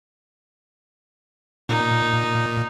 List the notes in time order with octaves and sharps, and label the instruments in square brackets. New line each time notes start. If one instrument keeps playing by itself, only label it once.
[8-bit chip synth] A#2 [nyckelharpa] D#4